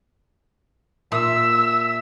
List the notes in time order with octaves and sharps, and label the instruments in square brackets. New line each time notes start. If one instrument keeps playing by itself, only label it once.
[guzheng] A#2 [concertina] E5 [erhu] E6